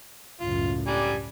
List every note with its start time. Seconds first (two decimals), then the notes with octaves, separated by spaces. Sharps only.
0.40 C#2 F#2 A2 F4
0.87 G3 D4 G#5